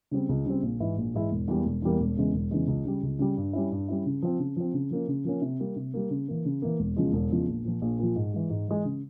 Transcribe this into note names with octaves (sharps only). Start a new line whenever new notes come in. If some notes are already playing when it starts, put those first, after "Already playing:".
C#3 G3 C4
C#2
C#3 G3 C4
A#1
G#2 E3 G#3 E4
A#1
G#2 E3 G#3 E4
E1
E2 E3 G3 A#3
E1
E2 E3 G3 A#3
E1
E2 C#3 E3 G#3
E1
E2 C#3 E3 G#3
C#2
C#3 G3
C#2
C#3 G3
G2
G3 C#4 E4
G2
G3 C#4 E4
C#3
F3 C4
C#3
F3 C4
C#3
F3 A#3 C#4
C#3
F3 A#3 C#4
C3
G3 A#3
C3
G3 A#3
C#3
E3 A#3
C#3
E3 A#3
E1
E2 C#3 F3 G#3
E1
E2 C#3 F3 G#3
A#1
A#2 F3
A#1
A#2 F3
G#2
E3 G#3
G#2
E3 G#3
C#3